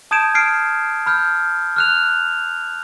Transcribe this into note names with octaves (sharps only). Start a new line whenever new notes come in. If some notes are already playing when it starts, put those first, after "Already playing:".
A5 D#6 G6 G#6 D7 E7
F6 C7 D7
B5 F6 G6
F6 F#6 F7